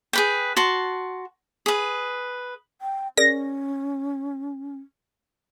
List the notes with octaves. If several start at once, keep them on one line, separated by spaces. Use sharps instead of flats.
G#4 B4 G5
F#4 A5 C6
G#4 B4
G5
C#4 G#4 A#4 D5 A#6